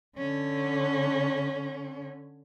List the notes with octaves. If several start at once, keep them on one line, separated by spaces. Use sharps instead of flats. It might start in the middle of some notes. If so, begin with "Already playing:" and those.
D3 C#4